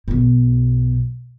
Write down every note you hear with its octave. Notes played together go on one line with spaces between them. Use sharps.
B1 B2